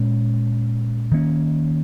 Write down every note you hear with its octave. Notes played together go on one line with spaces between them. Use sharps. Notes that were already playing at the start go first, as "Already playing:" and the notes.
Already playing: A#2 G#3 C#4
D#3 A#3 C#4